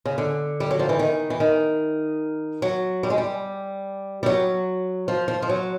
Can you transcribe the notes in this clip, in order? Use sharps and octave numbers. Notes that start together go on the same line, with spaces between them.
C#3
D3
G3
F#3
F3
E3
D#3
E3
D#3
F#3
G3
G#3
G3
G3
F#3
F3
F3
F3
F#3